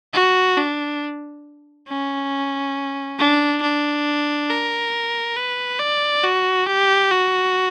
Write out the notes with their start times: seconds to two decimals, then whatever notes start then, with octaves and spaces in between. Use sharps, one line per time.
0.14 F#4
0.57 D4
1.88 C#4
3.18 D4
3.62 D4
4.50 A#4
5.37 B4
5.80 D5
6.23 F#4
6.67 G4
7.11 F#4